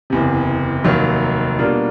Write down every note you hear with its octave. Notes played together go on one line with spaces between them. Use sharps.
F#1 E2 C3
F1 D#2 D#3 F#3
B2 G3 A#3 D4 F4